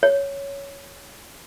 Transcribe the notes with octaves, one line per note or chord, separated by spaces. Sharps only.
C#5